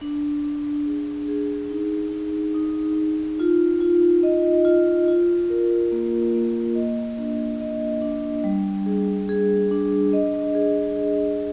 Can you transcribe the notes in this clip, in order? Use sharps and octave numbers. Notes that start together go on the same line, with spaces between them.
D4
D4
G#4
G#4
D#4
D#4
D#4
D#4
F4
F4
D#5
F4
F4
A#4
A#3
A#3
D#5
D4
D#5
D4
G3
G#4
G#4
D4
D#5
G#4
G#4